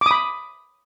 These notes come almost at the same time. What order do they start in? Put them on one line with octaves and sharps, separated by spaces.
D6 D#6 B5